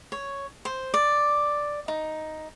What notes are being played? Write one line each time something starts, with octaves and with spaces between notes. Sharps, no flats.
C#5
C5
D5
D#4